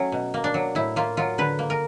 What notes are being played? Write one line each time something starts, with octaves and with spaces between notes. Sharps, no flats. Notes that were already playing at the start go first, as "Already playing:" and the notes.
Already playing: F#3 A3 C#4
B2
A#3
D4
F#3
A2 E4
A#3 F4
F#3 F4
D3 B4
A#3
A#4